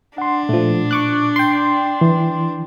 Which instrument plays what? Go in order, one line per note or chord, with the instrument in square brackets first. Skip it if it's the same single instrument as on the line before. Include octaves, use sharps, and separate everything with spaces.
[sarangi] D4 [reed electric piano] F#5 C6
[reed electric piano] A#2 [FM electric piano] F3 A3
[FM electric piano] C#6 D6 F#6
G5 C6
[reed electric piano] E3